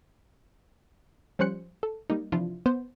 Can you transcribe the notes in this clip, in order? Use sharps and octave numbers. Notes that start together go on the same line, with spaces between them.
F3 G3 C#4 C5 F#6 C#7
A4
G3 A#3 D#4
C3 E3 F3 D4 E4 F4
B3 C5